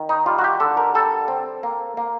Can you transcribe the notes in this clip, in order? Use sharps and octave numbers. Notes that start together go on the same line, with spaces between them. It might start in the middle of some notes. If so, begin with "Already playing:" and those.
Already playing: D#3
D#4
G3 F4
F#4
G4
D3 A4
A#4
G3 A4
C4
A#3
A#3